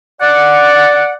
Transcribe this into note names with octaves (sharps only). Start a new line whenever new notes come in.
D5 F#5